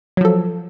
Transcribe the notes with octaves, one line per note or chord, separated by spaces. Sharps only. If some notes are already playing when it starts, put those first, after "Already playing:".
F3 F#3 A4